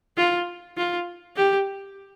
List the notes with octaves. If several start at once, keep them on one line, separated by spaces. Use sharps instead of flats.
F4
F4
G4